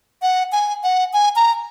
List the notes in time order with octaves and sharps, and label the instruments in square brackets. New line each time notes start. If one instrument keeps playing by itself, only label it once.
[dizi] F#5
G#5
F#5
G#5
A#5